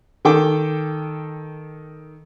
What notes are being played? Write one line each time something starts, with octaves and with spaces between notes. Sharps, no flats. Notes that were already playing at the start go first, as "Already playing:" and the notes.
D#3 A4 G5 D6